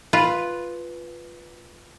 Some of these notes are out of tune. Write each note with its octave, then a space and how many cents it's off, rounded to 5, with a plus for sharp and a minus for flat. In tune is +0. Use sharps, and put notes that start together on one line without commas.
F4 +0 B4 +0